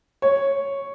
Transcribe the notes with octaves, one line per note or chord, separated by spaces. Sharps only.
C#5